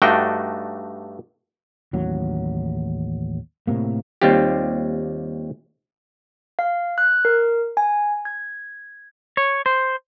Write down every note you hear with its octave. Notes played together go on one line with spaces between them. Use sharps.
G2 A3 D4 D#4 F#4 G5
A1 D#2 F#3
A2 C3 A#3
D#2 G3 C4 F4 G4
F5
F#6
A#4
G#5
G#6
C#5
C5